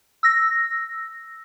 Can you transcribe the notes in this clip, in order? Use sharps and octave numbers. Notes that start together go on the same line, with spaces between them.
E6 A#6